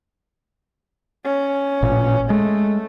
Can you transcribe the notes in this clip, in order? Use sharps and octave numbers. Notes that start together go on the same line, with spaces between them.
C#4
A1 A#2
G#3 A3